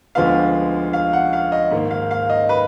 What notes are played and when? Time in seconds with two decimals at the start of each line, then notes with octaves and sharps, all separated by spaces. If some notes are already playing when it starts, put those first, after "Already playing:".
0.15 D2 D3 F3 G#3 B3 F5
0.93 F5
1.13 F#5
1.33 F5
1.52 D#5
1.71 G#2 D#3 A#3
1.91 F5
2.11 F5
2.30 D#5
2.49 B4